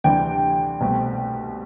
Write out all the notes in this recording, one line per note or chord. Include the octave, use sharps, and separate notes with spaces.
D2 C3 E3 G3 D4 G5
C2 B2 A3 C4